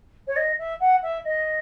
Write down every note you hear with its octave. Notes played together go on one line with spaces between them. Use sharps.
C#5
D#5
E5
F#5
E5
D#5